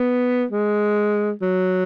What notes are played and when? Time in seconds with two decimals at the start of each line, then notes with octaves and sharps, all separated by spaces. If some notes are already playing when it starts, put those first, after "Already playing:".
Already playing: B3
0.51 G#3
1.42 F#3